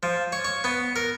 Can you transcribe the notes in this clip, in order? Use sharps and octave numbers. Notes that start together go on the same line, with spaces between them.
F3
C#5
C#5
B3
A#4